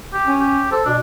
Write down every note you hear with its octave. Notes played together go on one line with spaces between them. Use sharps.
G4
C#4
G4
A4 C5
B2 D4